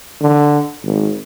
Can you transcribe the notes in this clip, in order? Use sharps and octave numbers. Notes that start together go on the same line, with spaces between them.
D3
G#1